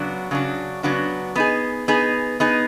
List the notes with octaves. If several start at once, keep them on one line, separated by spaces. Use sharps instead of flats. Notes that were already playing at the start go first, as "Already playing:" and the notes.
Already playing: C#3 F#3 B3 D4 F#4
C#3 F#3 B3 D4 F#4
C#3 F#3 B3 D4 F#4
B3 D#4 G#4
B3 D#4 G#4
B3 D#4 G#4